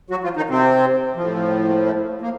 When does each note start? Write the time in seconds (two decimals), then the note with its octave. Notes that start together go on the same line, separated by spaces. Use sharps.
0.10 F#3 F#4
0.24 F3 F4
0.37 D#3 D#4
0.50 C3 C4
1.16 A2 F3
1.68 A#3
1.86 A3
2.22 A#3